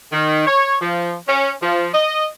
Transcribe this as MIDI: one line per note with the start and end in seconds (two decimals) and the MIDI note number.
0.11 0.43 51
0.46 0.75 73
0.79 1.14 53
1.27 1.51 61
1.60 1.87 53
1.93 2.25 75